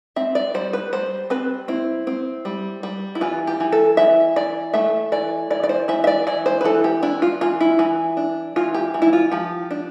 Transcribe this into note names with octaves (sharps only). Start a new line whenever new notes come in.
C4 E5
D5
G3 C5
B4
G3 C5
C4 B4
C4 E4
C4
G3
G3
E4
E3 F4
G4
E3
A4
E3 E5
E3 D5
A3 E5
E3 D5
E3 D5
D5
C5
E3 E5
E5
D5
E3 D5
C5
B4
E3 A4
G4
D4 E4
F4
E3 F4
E4
E3
D4
E3 F4
G4
E3
E4
F4
F3 G4
D4